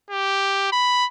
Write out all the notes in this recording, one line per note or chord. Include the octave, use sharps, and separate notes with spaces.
G4
B5